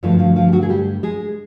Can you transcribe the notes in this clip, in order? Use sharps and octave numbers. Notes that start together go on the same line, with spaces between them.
G2 D3 F3 F#3 A3 F4
F3 F4
F3 F4
G4
F#3 F#4
G#4
G3 G4
G#3 G#4